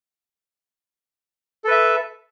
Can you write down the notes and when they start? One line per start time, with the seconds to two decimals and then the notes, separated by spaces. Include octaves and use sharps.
1.64 A4
1.68 B4
1.71 E5